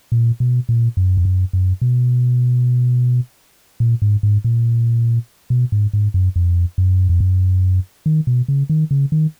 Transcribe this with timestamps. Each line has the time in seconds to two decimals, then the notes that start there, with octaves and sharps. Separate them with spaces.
0.12 A#2
0.40 B2
0.69 A#2
0.97 F#2
1.17 F2
1.25 F#2
1.53 F#2
1.82 B2
3.80 A#2
4.02 G#2
4.23 G#2
4.44 A#2
5.50 B2
5.72 G#2
5.93 G#2
6.14 F#2
6.36 F2
6.78 F#2
7.09 F2
7.20 F#2
8.06 D#3
8.27 B2
8.48 C#3
8.69 D#3
8.91 C#3
9.12 D#3